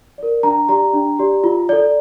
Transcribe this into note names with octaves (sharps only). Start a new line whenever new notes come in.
A#4 D5
D4 A#5
G4 D5 A#5
D4
G4 D5
F4
A4 D5